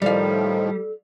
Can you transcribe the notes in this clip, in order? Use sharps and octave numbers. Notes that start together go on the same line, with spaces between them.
A2 D#3 F3 G3 A4 D5 F5